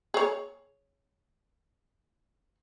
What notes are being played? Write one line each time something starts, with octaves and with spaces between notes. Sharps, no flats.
G#4 C#5